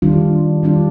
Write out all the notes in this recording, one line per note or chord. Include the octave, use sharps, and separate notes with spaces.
D#3 G3 D4 F4
D#3 G3 D4 F4